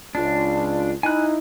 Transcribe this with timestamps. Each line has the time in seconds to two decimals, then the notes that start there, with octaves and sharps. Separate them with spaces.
0.15 C#2 D4 F4
1.03 D#4 E4 G#5 F#6